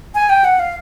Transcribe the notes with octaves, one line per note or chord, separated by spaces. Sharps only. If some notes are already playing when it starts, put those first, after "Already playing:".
G#5
G5
F#5
F5